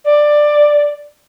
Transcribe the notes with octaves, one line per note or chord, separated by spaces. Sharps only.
D5